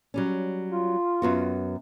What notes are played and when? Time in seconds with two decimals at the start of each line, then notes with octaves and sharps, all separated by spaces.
0.14 F#3 G3 C#4
0.71 F4
1.22 F#2 B3 F#4